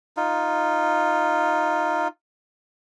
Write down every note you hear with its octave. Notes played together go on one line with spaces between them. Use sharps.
D#4 F4